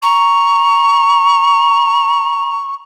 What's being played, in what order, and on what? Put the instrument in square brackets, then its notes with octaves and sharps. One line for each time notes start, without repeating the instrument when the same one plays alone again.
[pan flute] A#5 [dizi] C#6